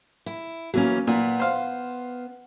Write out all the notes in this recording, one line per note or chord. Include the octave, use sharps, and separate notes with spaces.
E4
E3 F#3 A#3 C#4
A#2 B3
C5 F5